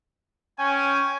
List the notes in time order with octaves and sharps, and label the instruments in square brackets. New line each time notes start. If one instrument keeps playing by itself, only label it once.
[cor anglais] C#4 [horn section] G5 G#5